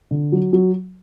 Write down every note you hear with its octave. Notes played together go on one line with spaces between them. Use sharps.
D3
F#3
F#3